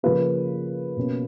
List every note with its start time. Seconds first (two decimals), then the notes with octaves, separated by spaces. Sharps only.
0.03 C#3 F3 A#3 B4
0.97 B2 A#3 C#4